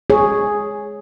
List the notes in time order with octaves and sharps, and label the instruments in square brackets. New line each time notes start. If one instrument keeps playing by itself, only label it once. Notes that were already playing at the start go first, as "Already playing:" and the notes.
[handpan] G#4 C#5